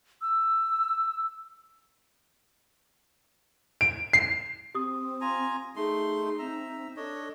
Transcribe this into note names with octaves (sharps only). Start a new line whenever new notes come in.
E6
D7
C7
C4 G4 D#6
F4 G#5 A#5
A3 D#4 G#4 C6
C4 E5 A#5
D4 A4 C#5 D#5